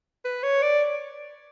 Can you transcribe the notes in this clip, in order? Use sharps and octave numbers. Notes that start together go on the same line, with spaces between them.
B4
C#5
D5